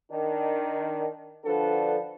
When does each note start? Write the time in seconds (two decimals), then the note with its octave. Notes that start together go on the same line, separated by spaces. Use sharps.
0.12 D#3 D4
1.45 D3 F3 D4 F#4 A4 B4